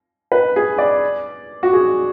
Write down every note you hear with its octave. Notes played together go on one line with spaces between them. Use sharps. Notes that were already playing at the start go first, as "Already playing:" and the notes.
B4
G#4
D5
F#4
G#4